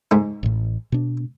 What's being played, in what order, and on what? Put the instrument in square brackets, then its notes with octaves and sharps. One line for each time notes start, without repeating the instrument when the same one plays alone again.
[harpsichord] G#2 G#3 D#4
[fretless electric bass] A1 A2
B2 D4